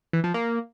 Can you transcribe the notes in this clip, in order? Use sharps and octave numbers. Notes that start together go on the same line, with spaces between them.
E3
F3
A#3